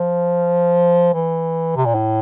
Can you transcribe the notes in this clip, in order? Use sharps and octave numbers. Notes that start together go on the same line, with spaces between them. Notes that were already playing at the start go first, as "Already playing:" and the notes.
Already playing: F3
E3
C3
A#2
A2